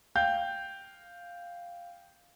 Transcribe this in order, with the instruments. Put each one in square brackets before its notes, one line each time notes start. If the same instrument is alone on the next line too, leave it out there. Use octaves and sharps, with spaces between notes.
[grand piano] F5 G5 G6